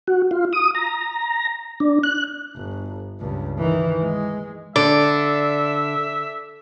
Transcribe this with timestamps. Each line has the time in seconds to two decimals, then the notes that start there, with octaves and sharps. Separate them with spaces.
0.07 F#4
0.31 F4
0.53 D#6
0.75 A#5
1.80 D4
2.03 F#6
2.56 G1
3.20 C#2 G2
3.58 D#3 E3
4.02 G#3
4.76 D3 D5 E5